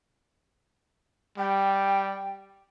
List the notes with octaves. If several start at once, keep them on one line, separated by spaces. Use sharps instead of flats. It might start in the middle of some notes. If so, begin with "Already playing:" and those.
G3 G5